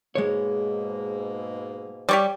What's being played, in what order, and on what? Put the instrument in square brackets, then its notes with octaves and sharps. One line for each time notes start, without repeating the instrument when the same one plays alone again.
[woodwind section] G#2 B2 A#3 [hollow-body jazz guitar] G#3 C#5
[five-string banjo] G3 [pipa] G4 C#5 D5